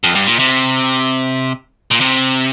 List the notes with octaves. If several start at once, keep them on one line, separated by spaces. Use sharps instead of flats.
F2
G2
A#2
C3
A#2
C3